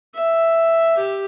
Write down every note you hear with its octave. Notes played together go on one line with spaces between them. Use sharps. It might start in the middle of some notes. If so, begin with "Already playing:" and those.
E5
G4